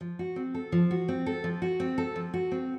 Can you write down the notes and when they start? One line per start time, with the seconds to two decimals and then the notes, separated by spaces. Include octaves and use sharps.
0.01 F3
0.19 F#4
0.36 C4
0.54 A4
0.72 F3
0.91 F#4
1.08 C4
1.26 A4
1.44 F3
1.62 F#4
1.80 C4
1.98 A4
2.16 F3
2.34 F#4
2.52 C4